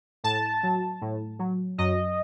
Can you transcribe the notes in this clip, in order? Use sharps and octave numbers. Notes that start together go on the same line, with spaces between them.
A2 A5
F#3
A2
F#3
F#2 D#5